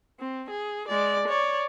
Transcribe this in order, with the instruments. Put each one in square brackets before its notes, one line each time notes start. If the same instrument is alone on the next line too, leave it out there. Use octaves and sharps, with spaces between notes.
[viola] C4
G#4
G#3 D5
C#5 D5